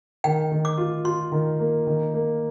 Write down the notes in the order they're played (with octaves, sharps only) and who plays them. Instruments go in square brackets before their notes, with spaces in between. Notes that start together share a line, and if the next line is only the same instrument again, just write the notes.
[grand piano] D#3 [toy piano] G5
[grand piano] D#3
[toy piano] D6
[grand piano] F4
[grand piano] F4 [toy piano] C6
[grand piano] D#3
A#3
D#3
A#3